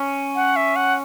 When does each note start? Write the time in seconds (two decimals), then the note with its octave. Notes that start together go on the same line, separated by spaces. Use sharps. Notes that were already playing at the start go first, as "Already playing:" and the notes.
Already playing: C#4
0.35 F#5
0.56 E5
0.76 F#5